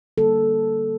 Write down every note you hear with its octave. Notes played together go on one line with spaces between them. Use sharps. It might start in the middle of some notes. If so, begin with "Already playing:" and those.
D3 G3 A#3 A4